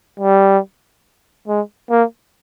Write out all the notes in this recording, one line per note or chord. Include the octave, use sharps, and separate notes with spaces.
G3
G#3
A#3